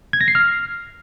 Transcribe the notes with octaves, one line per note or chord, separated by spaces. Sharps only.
G#6
A#6
C7
F6